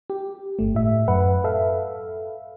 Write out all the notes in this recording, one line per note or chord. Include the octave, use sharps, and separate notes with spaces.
G4
G1 A3
A2 E5
F#2 B4 F#5
A4 E5 F5